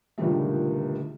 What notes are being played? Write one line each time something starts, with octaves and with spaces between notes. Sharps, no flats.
C#2 A#2 D3 D#3 G3 A3